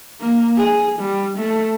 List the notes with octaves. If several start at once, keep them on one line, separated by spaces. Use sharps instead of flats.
A#3
G#4
G3
A3